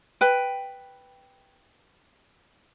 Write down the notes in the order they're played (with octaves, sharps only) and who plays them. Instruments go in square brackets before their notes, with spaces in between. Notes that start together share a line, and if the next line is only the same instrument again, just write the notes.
[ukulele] B4 G5